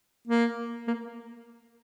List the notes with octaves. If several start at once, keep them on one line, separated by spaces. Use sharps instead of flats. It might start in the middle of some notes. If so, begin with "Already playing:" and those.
A#3
A#3